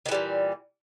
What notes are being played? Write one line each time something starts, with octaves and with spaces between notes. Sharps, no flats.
A#2 D#3 E3 G3